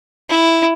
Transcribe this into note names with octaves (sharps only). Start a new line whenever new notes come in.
E4